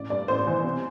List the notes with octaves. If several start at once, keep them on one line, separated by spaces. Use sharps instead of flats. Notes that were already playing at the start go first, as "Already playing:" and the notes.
Already playing: A1 D5
G2 D5
A1 C5
E3
C3